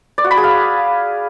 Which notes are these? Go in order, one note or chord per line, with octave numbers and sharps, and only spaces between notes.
D5
F#4
B5
G#4
F5